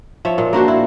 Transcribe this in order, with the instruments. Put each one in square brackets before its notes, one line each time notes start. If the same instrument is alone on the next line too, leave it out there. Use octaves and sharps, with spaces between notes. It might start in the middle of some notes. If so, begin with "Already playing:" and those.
[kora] F3 C#5 E5
A#2
A#3 D4 F#4 C5
E4